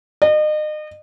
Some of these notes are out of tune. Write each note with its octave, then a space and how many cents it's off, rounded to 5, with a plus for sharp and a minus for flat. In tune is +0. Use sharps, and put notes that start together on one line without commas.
D#5 -35